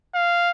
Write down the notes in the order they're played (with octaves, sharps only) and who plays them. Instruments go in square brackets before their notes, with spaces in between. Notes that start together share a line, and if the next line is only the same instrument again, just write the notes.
[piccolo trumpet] F5